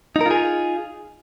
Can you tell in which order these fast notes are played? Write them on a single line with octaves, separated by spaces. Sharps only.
D#4 A#4 F4 G#4